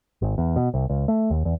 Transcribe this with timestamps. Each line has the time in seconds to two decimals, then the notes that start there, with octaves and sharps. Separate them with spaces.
0.22 G#1
0.38 E2
0.56 B2
0.74 C2
0.90 C#2
1.08 A3
1.30 D#2
1.45 E2